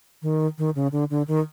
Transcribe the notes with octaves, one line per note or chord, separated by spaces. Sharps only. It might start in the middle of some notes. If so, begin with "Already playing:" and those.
D#3
D#3
C#3
D3
D3
D#3